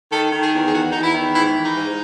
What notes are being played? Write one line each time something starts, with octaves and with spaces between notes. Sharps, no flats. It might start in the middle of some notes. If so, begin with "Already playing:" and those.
D#3 A4
D#3
G#4
E2
G#4
E2 F#4
E2 D#4
E4
D#3
G#2 E4
E3
D#4
G#2